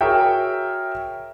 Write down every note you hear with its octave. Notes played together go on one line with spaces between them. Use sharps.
F#4 G#4 A#4 C#5 E5 G5